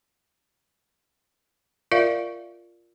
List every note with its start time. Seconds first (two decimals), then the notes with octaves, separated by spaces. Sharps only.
1.91 F4 A#4 D5 E5 F5